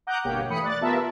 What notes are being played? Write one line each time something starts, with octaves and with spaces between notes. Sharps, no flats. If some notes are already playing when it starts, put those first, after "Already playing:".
F#5 A#5 D6 D#6 F#6 G6
G1 B2 A#3 G4 C#5 G5
E3 A3 B5 D#6 C#7
D5 F#6 A6
B3 F4 G4 A#4 E5 A5